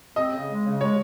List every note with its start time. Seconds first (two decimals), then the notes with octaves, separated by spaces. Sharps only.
0.16 C4 D#5
0.33 C#3
0.49 G#3
0.65 C#3
0.80 G#3 C#5